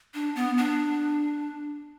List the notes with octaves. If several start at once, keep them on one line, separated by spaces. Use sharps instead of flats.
D4
B3
D4